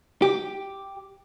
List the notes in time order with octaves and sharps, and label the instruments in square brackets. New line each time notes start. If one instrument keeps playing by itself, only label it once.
[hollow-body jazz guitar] G4